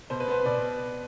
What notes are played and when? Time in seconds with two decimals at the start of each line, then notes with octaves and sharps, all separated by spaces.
0.10 B2 C5
0.20 B4
0.28 B3 C5
0.45 B2 D5